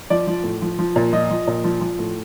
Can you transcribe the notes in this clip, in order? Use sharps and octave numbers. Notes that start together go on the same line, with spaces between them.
F3 D5
F3
A2
F3
F3
A#2
F3 D#5
F3
A#2
F3
F3
A2